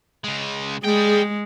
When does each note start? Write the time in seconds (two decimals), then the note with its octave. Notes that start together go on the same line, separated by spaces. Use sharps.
0.24 C#3 G#3
0.84 G3 G#3 G#4 G5